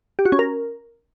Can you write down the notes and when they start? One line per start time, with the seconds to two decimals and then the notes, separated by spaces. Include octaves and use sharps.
0.19 G4
0.25 F#4
0.32 C#4
0.39 A#4